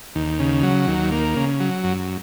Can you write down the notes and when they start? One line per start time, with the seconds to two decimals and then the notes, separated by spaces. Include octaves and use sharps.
0.15 D#2
0.39 C#3
0.63 F#3
0.87 D#2
1.12 A#3
1.36 C#3
1.60 F#3
1.84 F#2